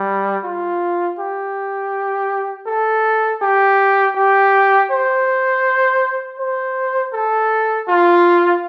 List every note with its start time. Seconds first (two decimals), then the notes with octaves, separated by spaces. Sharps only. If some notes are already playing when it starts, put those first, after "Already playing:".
Already playing: G3
0.44 F4
1.19 G4
2.67 A4
3.42 G4
4.16 G4
4.91 C5
6.39 C5
7.13 A4
7.88 F4